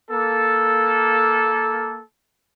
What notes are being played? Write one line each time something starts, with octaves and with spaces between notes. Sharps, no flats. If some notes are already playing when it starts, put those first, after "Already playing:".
A#3 A4